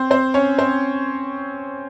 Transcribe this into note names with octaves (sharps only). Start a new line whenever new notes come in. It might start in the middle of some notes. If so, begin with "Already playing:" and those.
Already playing: C4 C5
C4 C5
C#4 C#5
C4 C5